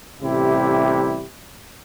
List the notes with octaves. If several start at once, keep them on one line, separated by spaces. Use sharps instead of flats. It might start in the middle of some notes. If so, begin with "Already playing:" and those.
A1 C3 G3 E4 G4